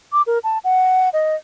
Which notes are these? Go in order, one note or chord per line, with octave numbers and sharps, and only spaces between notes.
D6
A#4
A5
F#5
D#5